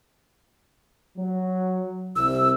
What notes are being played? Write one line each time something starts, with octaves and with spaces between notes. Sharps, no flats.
F#3
C2 C3 E6